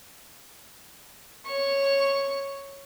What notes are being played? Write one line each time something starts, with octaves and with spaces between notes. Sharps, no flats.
C#5 C#6